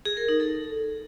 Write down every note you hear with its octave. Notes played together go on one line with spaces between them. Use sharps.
G#4
A#4
D#4
A4